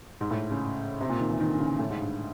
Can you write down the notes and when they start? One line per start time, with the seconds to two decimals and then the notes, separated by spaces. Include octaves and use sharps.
0.21 G#2
0.31 A2
0.51 C#3
1.01 C3
1.10 A#2
1.20 D#3
1.30 E3
1.40 D#3
1.50 D3
1.60 C#3
1.79 A2
1.90 G#2
2.01 G2